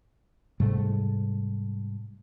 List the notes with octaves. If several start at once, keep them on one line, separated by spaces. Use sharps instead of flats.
G#2 C3 G3 A3